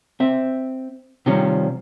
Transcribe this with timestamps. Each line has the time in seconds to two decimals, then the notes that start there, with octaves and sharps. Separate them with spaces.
0.20 C4 E5
1.26 C3 D#3 F3 G3 C#4